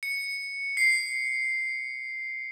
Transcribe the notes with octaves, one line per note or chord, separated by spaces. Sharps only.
C#7
C7